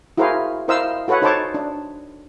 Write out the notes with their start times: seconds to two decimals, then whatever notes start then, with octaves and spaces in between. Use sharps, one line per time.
0.17 E4 F#4 G#4 A#4 C5 F5
0.68 E4 A#4 C5 D#5 F5 E6
1.08 F#4 A4 B4 C#5 F#5
1.22 D#4 A4 C5 C#5 A5 D6
1.54 D4